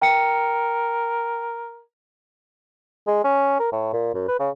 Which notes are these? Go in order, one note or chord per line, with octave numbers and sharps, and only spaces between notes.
A#4 G5 C#7
G#3
C#4
A#4
A2
A#2
F#2
B4
C#3